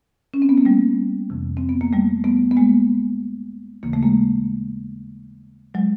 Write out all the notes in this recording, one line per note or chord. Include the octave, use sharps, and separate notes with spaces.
C#4
C4
B3
A#3
G3 A3
F2 C3 E3
C4
B3
A#3
G3 A3
A3 B3
B3
G#3 A#3
D#2 C#3 E3 A#3
A3
G#3 A#3
F#3 G#3